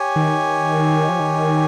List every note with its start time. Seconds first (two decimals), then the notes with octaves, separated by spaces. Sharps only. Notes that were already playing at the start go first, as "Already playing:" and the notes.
Already playing: G4 C#5 G#5
0.16 D#3
1.09 F3
1.20 D#3